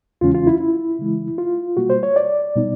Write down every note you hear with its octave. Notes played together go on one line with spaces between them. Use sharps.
E2 C#3 E3 G#3 C#4 F4
F4
E4
E4
C#3 E3 G#3
F4
B2 G3 A#3 F#4
C5
C#5
D5
B2 G3 B3 D#4